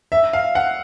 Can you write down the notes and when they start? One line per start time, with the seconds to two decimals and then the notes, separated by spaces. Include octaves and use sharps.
0.12 E5
0.33 F5
0.55 F#5